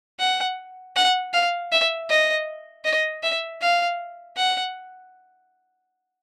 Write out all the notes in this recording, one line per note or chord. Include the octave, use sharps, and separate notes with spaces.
F#5
F#5
F5
E5
D#5
D#5
E5
F5
F#5